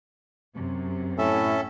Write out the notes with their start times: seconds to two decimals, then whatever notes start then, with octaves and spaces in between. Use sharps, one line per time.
0.54 F#2 C3
1.18 A2 C#4 A4 E5